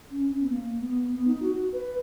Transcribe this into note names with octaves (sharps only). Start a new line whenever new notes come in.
C#4
C#4
B3
A#3
A#3
B3
B3
D#4
F#4
B4